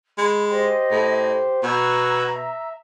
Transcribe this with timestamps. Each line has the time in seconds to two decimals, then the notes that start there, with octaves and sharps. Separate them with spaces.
0.18 G#3 B5
0.50 G4 C5 D#5
0.91 A2
1.63 B2 F#5 A#5 E6 G#6
2.35 E5